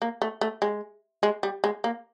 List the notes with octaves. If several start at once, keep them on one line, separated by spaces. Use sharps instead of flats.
A#3
A3
A3
G#3
G#3
G3
G#3
A#3